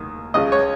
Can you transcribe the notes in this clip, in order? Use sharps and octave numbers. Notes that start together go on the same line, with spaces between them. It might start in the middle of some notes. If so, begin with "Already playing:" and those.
Already playing: D#2 D#3 A#3
C#2 C#3 G#3 D#5
C#5